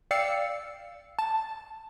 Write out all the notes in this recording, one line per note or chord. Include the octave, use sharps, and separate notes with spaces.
D5 F5 G5 E6 C7 C#7
A5